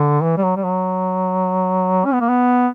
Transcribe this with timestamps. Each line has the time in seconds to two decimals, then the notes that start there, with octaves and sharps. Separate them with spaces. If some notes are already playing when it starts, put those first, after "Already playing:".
Already playing: D3
0.23 E3
0.37 G3
0.43 F#3
0.56 G3
0.64 F#3
2.05 C#4
2.13 B3
2.21 A#3
2.29 B3